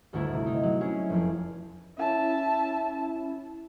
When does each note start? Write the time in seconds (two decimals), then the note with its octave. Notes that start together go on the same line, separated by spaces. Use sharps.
0.13 G1 D2 A3 E4
0.33 C3
0.46 D#4
0.63 F#3
0.81 C#4 E4 G#4
1.10 F1 F2
1.98 C#4 E4 E5 A5